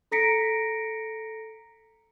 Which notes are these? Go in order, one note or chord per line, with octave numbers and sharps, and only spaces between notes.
A4 A#5 A#6 B6 C#7 D7